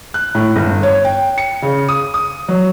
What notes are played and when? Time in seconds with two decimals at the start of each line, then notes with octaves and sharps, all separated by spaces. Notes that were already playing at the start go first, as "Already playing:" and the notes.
0.14 F#6
0.35 A2
0.56 G1
0.83 C#5
1.05 G5
1.38 C#7
1.62 C#3
1.88 D#6
2.14 D#6
2.49 F#3